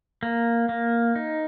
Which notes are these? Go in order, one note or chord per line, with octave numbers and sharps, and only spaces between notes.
A#3
A#3
D#4